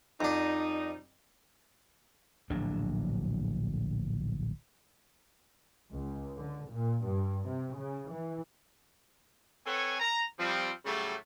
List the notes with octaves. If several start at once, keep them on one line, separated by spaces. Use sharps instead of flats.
F2 F3 G3 D4 D#4
D1 A#1 F#3 D4
C#2
D3
A#2
G2
C3
C#3
E3
C4 A4 B4 C#5 F#5 G#5
A#5
F3 G3 C4
A2 C#3 F#3 G3 A3